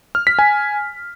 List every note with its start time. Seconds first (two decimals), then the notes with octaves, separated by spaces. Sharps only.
0.15 F6
0.27 B6
0.39 G#5